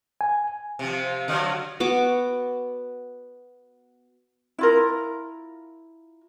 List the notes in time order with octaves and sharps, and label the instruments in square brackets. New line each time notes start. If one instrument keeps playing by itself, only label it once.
[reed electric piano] G#5
[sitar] C3 F3
D3 F#3
[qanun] B3 F#4 D6
[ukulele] E4 F4 A#4